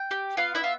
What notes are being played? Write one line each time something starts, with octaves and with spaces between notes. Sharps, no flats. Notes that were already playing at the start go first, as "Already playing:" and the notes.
Already playing: G5
G4
B3 F4 F5
E4 E5
F4